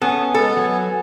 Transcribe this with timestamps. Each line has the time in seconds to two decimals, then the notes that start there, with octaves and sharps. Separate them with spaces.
0.02 B3 C#4 G#4 A4
0.34 G#3 B3 A4
0.57 F#3 G#5